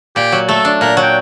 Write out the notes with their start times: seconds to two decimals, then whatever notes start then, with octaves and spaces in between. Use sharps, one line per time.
0.16 A#2 G4
0.32 F#3
0.49 A3 A4
0.65 D4
0.81 A#2 A#4
0.97 F#3
1.03 G5